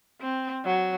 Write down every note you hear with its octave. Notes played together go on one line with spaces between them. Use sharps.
C4
F#3